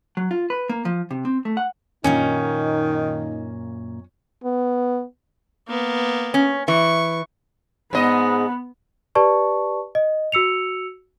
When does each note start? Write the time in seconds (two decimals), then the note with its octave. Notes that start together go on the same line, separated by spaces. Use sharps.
0.17 F#3
0.31 F4
0.50 B4
0.69 A#3
0.85 F3
1.11 C3
1.25 C4
1.45 A3
1.57 F#5
2.04 F#2 A#2 D#3 A#3 C#4 D#4
4.44 B3
5.68 A#3 B3
6.34 C#4
6.68 E3 C#6
7.93 G#2 B3 D#5
9.15 G4 B4 D5 A5 C#6
9.95 D#5
10.32 F#4 E6 C#7 F7